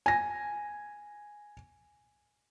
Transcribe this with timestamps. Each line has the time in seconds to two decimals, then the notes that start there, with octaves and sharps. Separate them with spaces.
0.06 G#5 A#6